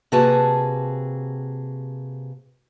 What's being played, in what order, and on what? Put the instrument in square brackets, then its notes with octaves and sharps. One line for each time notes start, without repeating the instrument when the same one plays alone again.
[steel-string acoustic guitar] C3 A#3 F#4 G#4 B4 A5